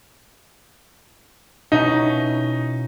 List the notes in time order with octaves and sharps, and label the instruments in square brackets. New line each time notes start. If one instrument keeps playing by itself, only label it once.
[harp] B2 C#4 E4 [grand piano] D#4